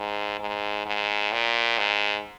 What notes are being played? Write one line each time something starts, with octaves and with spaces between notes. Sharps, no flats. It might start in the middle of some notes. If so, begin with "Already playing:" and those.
Already playing: G#2
G#2
G#2
A#2
G#2